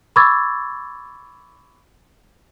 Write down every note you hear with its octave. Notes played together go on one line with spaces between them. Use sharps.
B5 C#6 D6 E6 G#6 A6